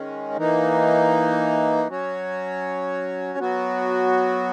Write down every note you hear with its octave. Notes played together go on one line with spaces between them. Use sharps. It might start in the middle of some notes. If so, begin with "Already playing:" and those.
Already playing: D#3 G#3 C#4
E3 A#3 D#4
F#3 C#4 F#4 C#5
F#3 B3 F#4